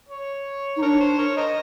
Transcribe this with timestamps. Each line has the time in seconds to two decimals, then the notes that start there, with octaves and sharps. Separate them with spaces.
0.09 C#5
0.76 D#4
0.82 D4 A#4 C#5
1.00 C5
1.19 A#4 C#5
1.37 A#4 C5 D#5